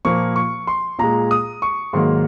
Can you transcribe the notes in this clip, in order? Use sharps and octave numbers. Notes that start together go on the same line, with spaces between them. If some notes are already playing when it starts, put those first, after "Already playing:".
A#2 F3 A#3 C#6
C#6
C6
A#2 G#3 A#5
D#6
C#6
G#2 D#3 F#3 A#3 C6